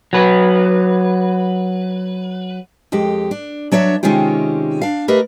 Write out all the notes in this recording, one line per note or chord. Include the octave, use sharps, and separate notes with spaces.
F#3 B4
F2 G#3 G4
D4
F#3 D4 C#5 D5 E5
C3 D#3 G#3 C#4 F4 G4
D4 F5
A3 G4 A#4 B4 D#5 F5